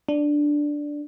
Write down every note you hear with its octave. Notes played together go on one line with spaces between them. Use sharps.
D4